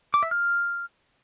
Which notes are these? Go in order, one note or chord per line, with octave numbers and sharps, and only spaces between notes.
D6
E5
F6